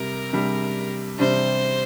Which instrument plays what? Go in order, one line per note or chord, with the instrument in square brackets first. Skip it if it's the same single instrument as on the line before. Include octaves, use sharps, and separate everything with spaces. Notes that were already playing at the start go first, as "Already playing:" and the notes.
Already playing: [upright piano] C3 G3 [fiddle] A#4
[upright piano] C3 G3 D4
[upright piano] C3 G3 D4 [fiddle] C5